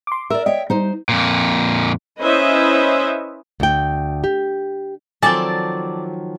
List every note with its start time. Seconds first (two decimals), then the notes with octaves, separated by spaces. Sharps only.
0.07 C6 D6
0.30 A#4 D5 E5 E6
0.46 C#5 D#5 E5 G5
0.70 G3 D#4 C5
1.09 F2 A#2
2.20 C#4 E4 B4 C5 D#5 E5
3.60 D2 G5
4.24 G4
5.23 D#3 F3 F#3 C4 A4 D5 G#5 A5